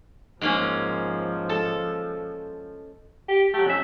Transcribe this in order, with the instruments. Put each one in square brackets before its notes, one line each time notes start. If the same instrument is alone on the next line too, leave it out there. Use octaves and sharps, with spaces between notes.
[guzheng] G#2 A#3 C#4 [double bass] F3
[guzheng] A4
[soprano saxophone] G4
[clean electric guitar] F#3 A3 [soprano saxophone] G4
[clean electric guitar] F2 E5 [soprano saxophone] C#4